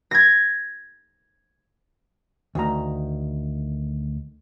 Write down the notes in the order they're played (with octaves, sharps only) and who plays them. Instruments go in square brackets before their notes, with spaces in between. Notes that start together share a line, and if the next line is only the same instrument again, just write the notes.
[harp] G#6 A#6
[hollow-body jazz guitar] D2 D#3 A#5